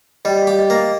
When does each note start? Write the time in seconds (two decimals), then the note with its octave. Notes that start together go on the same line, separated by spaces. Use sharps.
0.25 G3 D#5
0.42 F5
0.47 G4
0.59 D#5
0.70 A#3
0.75 D#5